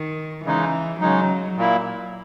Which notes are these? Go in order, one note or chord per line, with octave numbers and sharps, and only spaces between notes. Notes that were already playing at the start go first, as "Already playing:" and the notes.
Already playing: D#3
C#3 E3 G#3 D#4
C#3 F#3 G#3 D#4
A#2 A#3 E4